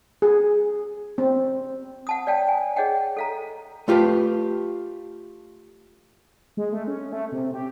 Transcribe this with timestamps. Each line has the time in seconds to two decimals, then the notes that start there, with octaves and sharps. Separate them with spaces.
0.22 G#4
1.18 C4
2.07 F#5 A5 D#6
2.27 C#5 D5 F5 G5 A5
2.48 G#5
2.76 G#4 C#5 D#5 F#5 G5
3.17 A4 F5 A#5
3.88 A3 F4 G4 B4 F5
6.57 G#3
6.72 A3
6.87 C#4
7.12 A3
7.32 C3
7.54 G4